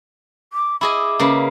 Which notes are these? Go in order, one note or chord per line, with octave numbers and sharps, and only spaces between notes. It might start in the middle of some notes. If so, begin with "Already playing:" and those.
D6
E4 G#4 D#5 D6
C#3 A#3 B4